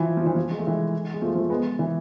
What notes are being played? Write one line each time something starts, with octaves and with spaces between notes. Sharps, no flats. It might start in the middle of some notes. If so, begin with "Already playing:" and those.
Already playing: E3 F3
F3
E3
F3
G#3
A3
E3 G#3
G#3
F3 A3
F3 A3
G#3 B3
E3